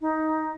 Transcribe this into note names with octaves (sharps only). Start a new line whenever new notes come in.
D#4